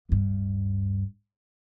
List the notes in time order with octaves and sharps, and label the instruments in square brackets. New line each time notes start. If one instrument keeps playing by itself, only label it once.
[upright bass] D1 G2